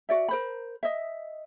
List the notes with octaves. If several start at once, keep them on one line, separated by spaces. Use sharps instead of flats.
F#4 D5 E5
A#4 C5 B5
D#5 E5